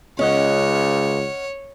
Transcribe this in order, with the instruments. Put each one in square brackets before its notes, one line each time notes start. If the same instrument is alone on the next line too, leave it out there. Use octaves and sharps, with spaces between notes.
[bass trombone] C#2 [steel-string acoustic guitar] C#4 D#5 F#5 [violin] C#5